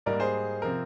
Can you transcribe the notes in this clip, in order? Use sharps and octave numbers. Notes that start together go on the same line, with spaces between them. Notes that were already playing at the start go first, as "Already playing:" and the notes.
G#2 G3 A#3 A#4 D5
G#4 C5
C3 F3 C4 A#4